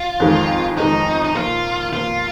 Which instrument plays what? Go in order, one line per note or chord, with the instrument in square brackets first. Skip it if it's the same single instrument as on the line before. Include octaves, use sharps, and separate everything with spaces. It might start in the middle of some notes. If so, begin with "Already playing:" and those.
Already playing: [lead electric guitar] F4
[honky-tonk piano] F2 D#3 G#3
[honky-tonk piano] F2 D#3 G#3 [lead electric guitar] D#4
[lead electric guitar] D#4
[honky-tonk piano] A#2 F3 A#3 [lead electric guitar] F4
[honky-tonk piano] A#2 F3 A#3 [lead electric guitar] F4